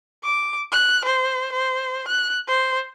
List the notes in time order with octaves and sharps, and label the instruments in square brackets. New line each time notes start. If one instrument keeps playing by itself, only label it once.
[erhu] D6
F#6
C5
C5
F#6
C5